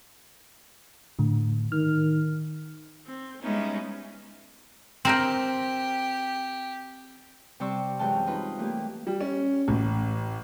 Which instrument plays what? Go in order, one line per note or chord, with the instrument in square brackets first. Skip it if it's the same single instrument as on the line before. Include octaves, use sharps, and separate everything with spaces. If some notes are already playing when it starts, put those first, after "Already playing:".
[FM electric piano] A2 D3
[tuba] D#3 [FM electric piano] F6
[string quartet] C4
G3 G#3 B3 C#4 D#4 E4
[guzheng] C4 A#4 G5 [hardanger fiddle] G4
[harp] C3 G3 C5 D5 C#6 E6
F#2 E3 G#3 G5 A5 F6
D#4 F4 B4
E3 A3 A#3 G4
[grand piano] G3
C#4
A1